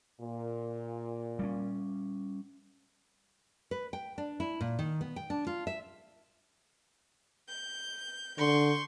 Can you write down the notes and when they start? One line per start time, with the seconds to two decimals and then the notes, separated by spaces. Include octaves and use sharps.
0.20 A#2
1.39 G3 C4 C#4
3.71 B4
3.93 G5
4.18 D4
4.40 E4
4.61 A#2
4.79 D#3
5.01 B3
5.16 G5
5.30 D4
5.47 F4
5.67 E5
7.49 G6
8.38 D3 C6 C#6 G6